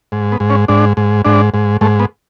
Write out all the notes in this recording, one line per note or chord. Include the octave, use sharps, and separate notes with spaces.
G#2
B3
G#2
C#4
G#2 D4
G#2
G#2 D4
G#2
G#2 A3
B3